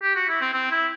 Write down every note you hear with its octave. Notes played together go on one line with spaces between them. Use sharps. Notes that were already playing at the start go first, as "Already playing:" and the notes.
G4
F#4
E4
C4
C4
E4